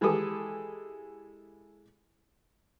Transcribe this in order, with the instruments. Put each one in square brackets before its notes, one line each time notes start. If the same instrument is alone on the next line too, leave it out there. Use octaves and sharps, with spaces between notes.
[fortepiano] E3 G#3 E4 G4 A4 D#6